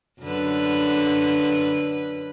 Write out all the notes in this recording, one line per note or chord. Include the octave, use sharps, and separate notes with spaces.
F#2 D3 B4